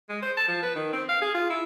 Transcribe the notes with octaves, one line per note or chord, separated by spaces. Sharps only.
G#3
C5
A5
F3
B4
D#3
C4
F5
G#4
F4
E4